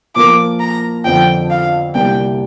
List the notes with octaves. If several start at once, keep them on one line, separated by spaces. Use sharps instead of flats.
A#2 F3 A#3 F4 A#4 D6
A#5
F2 D3 F3 C4 G5
F5
C2 C3 G3 A#3 D4 G5